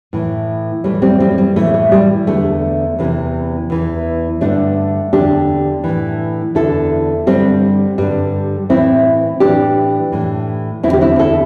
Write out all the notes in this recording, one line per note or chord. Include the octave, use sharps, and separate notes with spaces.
A2 E3
A2 E3 G3
G3 C4
G3 C4
G3
A2 E3 A3
A3
G3
E2 D3 A3
E2 C3 E3
E2 E3
G2 D3 A3 D4
E2 D3 D4 G4
A2 E3
E2 D3 E4 A4
G2 D3 G3 C4
G2 D3 G3
A2 E3 C4 E4
A2 E3 D4 G4
A2 E3
E2 D3 C4 E4
G4
C4 E4
E4 A4